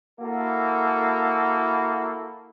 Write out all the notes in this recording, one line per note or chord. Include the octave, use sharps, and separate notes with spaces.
A#3 E4 F#4 A4